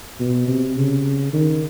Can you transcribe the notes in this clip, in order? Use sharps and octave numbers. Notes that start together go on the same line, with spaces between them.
B2
C3
C#3
D#3